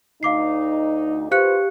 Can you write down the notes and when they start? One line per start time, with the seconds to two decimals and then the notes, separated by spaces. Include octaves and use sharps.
0.23 D2 D#4 F5 D6 C7
1.31 F4 G4 B4 C5 F5 F#6 C#7